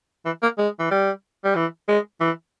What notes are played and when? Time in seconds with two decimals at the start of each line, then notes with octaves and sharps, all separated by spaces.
0.26 E3
0.42 A#3
0.58 G#3
0.79 E3
0.91 G3
1.45 G3
1.55 E3
1.88 G#3
2.21 E3